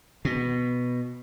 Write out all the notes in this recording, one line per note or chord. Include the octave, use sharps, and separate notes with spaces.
B2